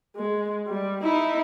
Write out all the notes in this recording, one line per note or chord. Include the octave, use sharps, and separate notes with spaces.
G#3
G3
D#4 E4